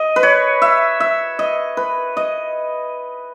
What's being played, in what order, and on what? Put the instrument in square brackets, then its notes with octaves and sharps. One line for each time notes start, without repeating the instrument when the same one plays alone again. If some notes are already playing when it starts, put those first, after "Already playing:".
Already playing: [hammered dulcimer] D#5
B4
C#5
E5
E5
D#5
B4
D#5